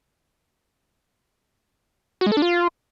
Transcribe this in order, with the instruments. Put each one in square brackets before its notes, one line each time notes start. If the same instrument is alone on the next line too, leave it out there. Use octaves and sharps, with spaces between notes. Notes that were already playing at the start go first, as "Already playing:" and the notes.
[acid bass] F#4
G#3
A4
D4
F4